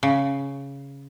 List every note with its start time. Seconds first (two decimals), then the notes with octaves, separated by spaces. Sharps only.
0.03 C#3